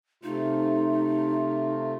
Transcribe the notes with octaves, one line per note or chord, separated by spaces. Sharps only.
C3 A3 D#4 F4